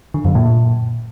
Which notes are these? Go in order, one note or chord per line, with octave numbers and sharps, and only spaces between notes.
D3
F#2
A#2